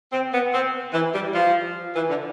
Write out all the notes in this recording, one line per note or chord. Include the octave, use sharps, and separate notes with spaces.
C4
B3
C4
E3
G3
F3
E3
D3